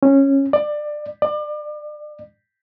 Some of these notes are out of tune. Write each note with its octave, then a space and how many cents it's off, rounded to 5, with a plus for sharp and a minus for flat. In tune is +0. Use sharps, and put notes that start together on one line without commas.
C#4 -15
D5 +25
D5 +35